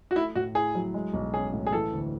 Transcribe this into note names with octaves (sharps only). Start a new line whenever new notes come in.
F#4
A3 E4
A2 F#4
E4 G#4
F#3
G#3
B1
C#4 G#4
A2
G#4
E3 A4
D2